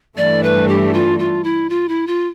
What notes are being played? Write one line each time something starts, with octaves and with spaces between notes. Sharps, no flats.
G2 E3 A3 D4 D5
B4
G4
F4
F4
E4
F4
E4
F4